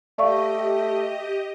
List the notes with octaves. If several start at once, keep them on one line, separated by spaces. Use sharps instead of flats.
A3 G4 D5 D#5 F5 C#6